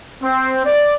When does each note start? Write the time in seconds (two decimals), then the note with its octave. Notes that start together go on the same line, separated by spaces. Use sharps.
0.23 C4
0.65 D5